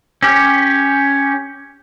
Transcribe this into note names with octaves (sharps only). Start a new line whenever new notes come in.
C#4 G4